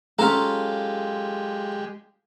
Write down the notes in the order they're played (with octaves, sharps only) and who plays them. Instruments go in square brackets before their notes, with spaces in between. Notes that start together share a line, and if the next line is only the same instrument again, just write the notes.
[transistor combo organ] G#3 G4 [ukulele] C#4 D#4 A#5 [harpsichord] F4 A4